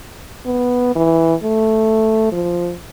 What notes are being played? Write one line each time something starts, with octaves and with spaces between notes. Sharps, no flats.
B3
E3
A3
F3